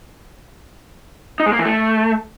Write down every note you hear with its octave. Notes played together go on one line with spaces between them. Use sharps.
D#4
G#3
A#3
E3
A3